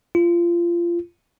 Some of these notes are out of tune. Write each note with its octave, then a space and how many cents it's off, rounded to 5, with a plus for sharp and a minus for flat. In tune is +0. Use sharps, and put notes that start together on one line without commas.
F4 -25